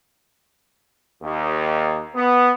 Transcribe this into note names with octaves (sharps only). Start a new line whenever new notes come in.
D#2
B3